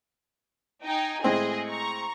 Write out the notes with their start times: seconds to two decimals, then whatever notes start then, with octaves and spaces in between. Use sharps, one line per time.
0.84 D#4 G5 G#5
1.24 A2 G#3 C4 G#4 D#5
1.67 A#5 C#6